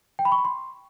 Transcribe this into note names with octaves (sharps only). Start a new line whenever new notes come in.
G5
B5
C#6
B5
C6